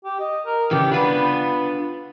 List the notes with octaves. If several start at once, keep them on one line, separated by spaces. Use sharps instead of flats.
G4
D#5
A#4
C#3 E3 G4
B3 D4 F4 B4